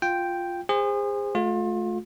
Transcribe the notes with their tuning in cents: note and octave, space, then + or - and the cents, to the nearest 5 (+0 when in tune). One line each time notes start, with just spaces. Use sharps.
F4 +0 G5 +0
G#4 -35 C5 +0
A3 -30 F4 +30